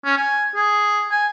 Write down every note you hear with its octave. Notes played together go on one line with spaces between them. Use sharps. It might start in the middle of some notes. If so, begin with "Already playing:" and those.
C#4
G#5
G#4
G#5